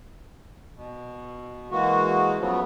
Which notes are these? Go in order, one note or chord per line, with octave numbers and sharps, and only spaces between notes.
B2
E3 G#3 A#3 F#4
C#3 F3 F#3 A3 B3